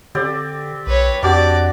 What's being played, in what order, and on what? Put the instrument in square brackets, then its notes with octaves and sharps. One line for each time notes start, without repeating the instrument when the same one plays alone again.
[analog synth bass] D3 [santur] C4 G4 D5
[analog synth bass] B1 [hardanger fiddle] B4 C#5
[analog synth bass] F2 [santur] D4 F#4 G4 [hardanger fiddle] D5